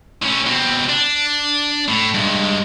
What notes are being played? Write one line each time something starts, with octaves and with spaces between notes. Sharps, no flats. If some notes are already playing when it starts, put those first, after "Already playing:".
A2 C#4
B2 C4
D4
A2
G2 G#3